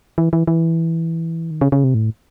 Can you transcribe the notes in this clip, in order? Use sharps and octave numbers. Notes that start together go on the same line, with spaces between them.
E3
E3
E3
D#3
C#3
C#3
C3
A2